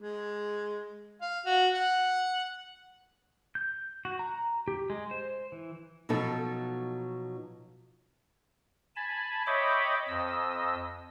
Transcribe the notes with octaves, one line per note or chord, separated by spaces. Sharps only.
G#3
F5
F#4
F#5
G6
F#4
A#5
G4
G#3
C5
E3
B2 F3 F#3 D#4 A4
G#5 A5 B5
C#5 D#5 E5 G5 B5 D6
F2 D#5 E6